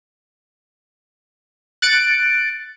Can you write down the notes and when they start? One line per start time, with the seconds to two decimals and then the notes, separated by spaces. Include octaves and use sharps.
1.82 F#6 A6 C#7 D7